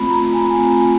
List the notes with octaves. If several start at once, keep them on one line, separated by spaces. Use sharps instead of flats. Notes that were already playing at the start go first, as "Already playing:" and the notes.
Already playing: A3 C4 F4 B5
A#5
G#5
A3 C4 F4